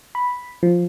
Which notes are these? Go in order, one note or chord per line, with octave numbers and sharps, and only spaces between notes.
B5
F3